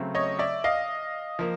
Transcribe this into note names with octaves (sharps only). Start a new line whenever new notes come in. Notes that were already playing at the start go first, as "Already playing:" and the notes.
Already playing: C#3 F#3 A3 C4
C#5 D#5
D5 E5
D#5 F5
F3 A#3